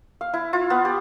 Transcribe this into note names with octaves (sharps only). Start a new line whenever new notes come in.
F5
E4
F4
B3
G4